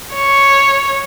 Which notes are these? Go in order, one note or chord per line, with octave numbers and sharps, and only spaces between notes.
C#5